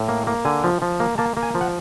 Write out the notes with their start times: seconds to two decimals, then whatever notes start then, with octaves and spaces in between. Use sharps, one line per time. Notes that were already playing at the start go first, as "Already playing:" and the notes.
Already playing: A2
0.09 A#3
0.27 A#3
0.45 D3 G#5
0.64 F3
0.82 F3
1.00 A#3
1.18 A#3 A5
1.37 A#3
1.43 G#5
1.55 F3
1.61 F#5